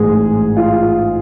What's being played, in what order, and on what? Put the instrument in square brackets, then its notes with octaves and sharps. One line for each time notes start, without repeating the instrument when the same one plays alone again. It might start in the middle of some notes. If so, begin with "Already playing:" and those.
Already playing: [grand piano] A1 G#2 G#3 [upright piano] G#4
[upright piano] F4